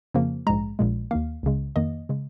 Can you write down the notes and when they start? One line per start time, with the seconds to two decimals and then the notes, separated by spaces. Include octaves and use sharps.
0.14 F2 C#3 F3 A#3
0.47 A#1 G#2 G#3 A#5
0.79 A#1 A#2 G#3
1.11 D#2 D#3 A#3 F5
1.43 C#2 C#3 G#3
1.76 F2 D#3 A#3 D#5
2.09 C#3 G#3